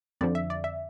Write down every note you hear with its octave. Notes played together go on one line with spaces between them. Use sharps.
F2 D3 F3 D5
E5
D5
E5